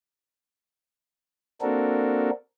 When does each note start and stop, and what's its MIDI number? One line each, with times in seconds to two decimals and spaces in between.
1.62 2.30 58
1.62 2.30 60
1.62 2.30 62
1.62 2.30 66
1.62 2.30 69
1.62 2.30 70